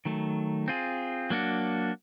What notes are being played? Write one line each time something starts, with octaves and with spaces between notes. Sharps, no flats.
D#3 F#3 A3
C4 F4 G#4
F#3 A#3 D4 F#4